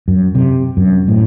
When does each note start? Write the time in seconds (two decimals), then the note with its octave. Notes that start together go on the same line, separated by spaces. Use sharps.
0.08 F#2
0.35 C3
0.77 F#2
1.08 A2